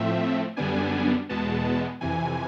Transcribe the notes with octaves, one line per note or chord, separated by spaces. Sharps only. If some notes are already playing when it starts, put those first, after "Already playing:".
Already playing: A2 F3 A3 C4 E5
F#2 D3 G3 B3 D4 G#5
E2 B2 G#3 B3 A5
F2 C3 E3 G#5